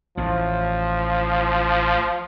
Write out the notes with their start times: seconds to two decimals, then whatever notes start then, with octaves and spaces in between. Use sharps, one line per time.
0.17 A1 A2 F3